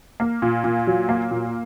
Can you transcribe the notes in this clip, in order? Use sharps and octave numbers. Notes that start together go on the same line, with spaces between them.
A#3
A#2
A#2
F#3
A#3
A#2